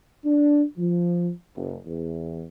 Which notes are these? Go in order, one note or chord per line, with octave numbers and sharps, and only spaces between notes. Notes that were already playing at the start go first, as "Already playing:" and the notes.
D4
F3
F#1
E2